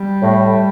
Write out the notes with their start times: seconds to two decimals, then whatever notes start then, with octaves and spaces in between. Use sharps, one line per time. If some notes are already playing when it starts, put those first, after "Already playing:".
Already playing: G3
0.22 A2